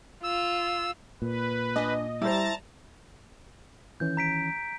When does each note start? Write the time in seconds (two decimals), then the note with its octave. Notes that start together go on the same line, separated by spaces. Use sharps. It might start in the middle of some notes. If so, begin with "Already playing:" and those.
0.24 F4 E6
1.22 A#2 B4
1.76 D4 D#5 G#5
2.22 G3 E4 C5 A5 A#5 A6
4.00 D#3 E3 C#4 G6
4.17 A#5 B6 D7